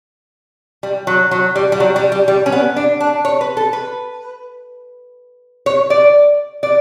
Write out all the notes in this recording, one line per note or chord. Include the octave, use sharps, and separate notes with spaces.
G3
F#3
F#3
G3
G3
F#3
G3
G3
G3
C#4
B3
D4
D4
C#5
B4
A4
B4
C#5
D5
D5